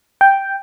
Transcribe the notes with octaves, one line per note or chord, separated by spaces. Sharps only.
G5